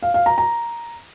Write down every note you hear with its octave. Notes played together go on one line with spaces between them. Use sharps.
F5
F5
A#5
A#5